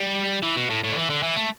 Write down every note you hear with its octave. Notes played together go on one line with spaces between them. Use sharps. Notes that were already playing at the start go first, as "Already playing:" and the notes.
Already playing: G3
E3
B2
A2
A2
D3
E3
D3
E3
A3